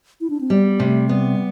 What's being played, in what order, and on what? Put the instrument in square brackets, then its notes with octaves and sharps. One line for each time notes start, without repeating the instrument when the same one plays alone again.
[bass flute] E4
D4
C4
[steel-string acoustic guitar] G3 [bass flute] B3
[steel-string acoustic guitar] C3 [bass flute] A3
[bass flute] G3 [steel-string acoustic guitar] B3